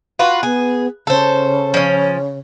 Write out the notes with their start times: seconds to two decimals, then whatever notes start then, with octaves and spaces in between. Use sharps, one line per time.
0.19 F4 F#4 B4
0.43 B3 G#4
1.07 C#3 A4 C5
1.74 F3 C#4